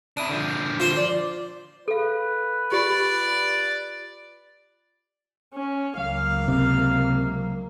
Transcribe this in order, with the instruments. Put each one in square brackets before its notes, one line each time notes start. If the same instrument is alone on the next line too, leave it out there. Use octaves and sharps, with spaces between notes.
[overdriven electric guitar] D4 E4 [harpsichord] D#6
[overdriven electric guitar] D3 F3
[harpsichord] F4 C5 C6
[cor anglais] D5
[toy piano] A4 F5 [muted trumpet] B4
[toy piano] F4 G4 [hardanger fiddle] D5
[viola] C#4
[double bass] C#2 A#3 [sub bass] F#3 [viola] F5
[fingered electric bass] C3